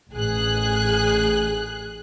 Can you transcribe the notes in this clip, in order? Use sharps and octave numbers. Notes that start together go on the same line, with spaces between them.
A1 G#4 F#6